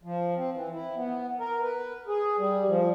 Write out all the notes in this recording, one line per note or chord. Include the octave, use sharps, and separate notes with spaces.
F3
C4
E3
E4
B3
A#4
B4
G#4
G3
F3